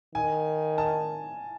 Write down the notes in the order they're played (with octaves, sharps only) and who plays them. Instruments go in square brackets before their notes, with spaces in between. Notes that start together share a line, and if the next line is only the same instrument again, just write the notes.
[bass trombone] D#3 [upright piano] G#5
[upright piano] A5